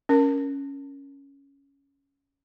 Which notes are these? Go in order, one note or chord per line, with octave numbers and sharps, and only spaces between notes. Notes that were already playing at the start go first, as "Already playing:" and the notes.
C#4 A#4